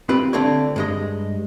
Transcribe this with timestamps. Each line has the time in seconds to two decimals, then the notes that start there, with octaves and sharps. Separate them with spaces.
0.09 C4 F4 G4 B4
0.33 D3 A3 C4 D4 F4 C#5
0.76 G2 G#3 D#5